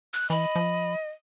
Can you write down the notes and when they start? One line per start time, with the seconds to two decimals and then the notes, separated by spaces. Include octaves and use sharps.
0.14 F#6
0.30 E3 D#5 B5
0.56 F3